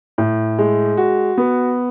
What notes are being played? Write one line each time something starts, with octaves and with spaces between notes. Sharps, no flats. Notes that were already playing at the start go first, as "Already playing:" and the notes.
A2
G#3
F#4
B3